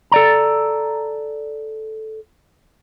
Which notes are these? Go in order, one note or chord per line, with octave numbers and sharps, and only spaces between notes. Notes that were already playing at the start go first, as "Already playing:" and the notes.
A4 D5 A#5